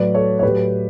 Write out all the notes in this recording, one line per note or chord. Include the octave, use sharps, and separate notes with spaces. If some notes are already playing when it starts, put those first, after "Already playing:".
Already playing: A2 F#3 B4 D5
A4 C#5
C#5
A2 F#3 G4 B4